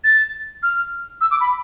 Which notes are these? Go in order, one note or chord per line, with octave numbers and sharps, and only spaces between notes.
A6
F6
E6
D6
B5